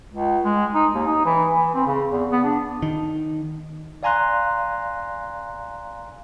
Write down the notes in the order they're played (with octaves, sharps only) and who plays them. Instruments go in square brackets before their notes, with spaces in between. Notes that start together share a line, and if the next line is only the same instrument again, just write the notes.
[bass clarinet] C#2
G#3
D#4
D#2
D#4
E3
E3
C4
C#3
E2
B3
D4
[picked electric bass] D#3
[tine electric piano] D5 F5 G#5 A#5 C6 F#6